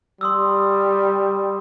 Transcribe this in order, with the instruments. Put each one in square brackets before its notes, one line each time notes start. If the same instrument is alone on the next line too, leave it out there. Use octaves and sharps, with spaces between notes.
[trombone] G3 [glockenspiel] C6 D#6 E6